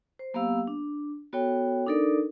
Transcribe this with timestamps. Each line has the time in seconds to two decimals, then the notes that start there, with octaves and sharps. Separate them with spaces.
0.19 C5
0.34 F#3 A#3 B3 G4 F5 E6
0.67 D4
1.33 B3 F#4 A4 C#5 G5
1.87 D4 D#4 A4 A#4 D5